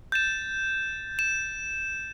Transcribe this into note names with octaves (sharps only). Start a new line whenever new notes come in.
G6 A6 E7
E7